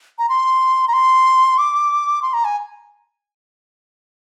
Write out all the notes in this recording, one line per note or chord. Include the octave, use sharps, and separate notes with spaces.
A#5
C6
A#5
C6
D6
C6
A#5
G#5